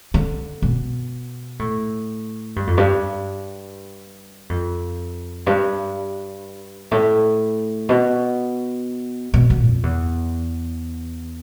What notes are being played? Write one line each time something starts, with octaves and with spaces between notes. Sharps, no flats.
D3
B2
A2
G2
F2
G2
F2
G2
A2
B2
B2
B2
F2
E2